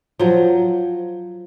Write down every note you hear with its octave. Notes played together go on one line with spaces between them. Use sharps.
F3 F#3